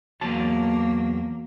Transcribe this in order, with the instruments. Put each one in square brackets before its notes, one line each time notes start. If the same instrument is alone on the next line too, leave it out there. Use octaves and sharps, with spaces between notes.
[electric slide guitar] E2 F#3 A5 [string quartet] A#3